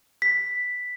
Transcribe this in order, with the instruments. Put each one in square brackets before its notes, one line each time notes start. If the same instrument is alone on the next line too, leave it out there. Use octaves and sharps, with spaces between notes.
[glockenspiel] B6